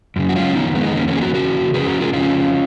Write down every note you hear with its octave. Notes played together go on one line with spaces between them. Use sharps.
F#2 C#3
F#4
C#4 F4
F2 D#3 B3 D#4
G#3 B3
D#4
F2 D#3 A#3 C#4
A#3 C#4
G#4
F#4 A#4
F2 C#3 F#4 A#4
F2 C#3 G#4 B4
F#4 A#4
F4 G#4
F2 C#3 C#4 F4